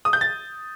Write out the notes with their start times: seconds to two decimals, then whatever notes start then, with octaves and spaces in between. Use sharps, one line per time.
0.05 D#6
0.13 G6
0.21 A6